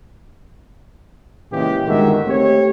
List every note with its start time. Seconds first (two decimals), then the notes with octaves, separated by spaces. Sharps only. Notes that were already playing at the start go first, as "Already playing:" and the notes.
1.52 A#2 C#3 E3 G#3 G4
1.87 G1 D#3 G#3 F#4 E5
2.27 A3 C4 G4 C#5